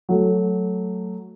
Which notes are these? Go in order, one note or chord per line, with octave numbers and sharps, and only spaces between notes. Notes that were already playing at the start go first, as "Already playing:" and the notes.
F#3 A3